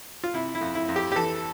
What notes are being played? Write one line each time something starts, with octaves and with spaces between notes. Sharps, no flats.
F4
C3 E4
E4
F2
E4
F2
G4
G4
E3 A4